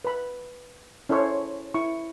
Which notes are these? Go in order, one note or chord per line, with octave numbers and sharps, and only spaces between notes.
B4 B5
C#4 E4 A4 C5 C#5 C#6
E4 C#6